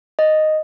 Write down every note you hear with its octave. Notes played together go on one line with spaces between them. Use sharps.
D#5